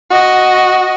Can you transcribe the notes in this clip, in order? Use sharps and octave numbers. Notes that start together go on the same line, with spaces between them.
F#4 D#5